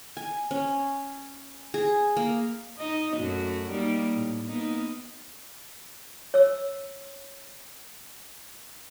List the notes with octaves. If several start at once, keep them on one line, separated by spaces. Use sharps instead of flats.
G#5
C#4
G#4
A#3
D#4 D#5
F#2 A3 F#4
G3 A#3 D#4
A2
A#3 B3 D#4
C#5 E6